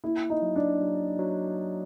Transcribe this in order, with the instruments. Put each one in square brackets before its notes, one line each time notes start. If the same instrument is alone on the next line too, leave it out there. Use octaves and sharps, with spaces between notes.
[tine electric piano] A#3 [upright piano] E4
[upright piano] D#4
[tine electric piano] F#3
[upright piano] D4
[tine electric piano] F#3
F#3